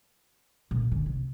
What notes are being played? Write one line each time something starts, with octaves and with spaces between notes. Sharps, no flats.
A#2
D3
C3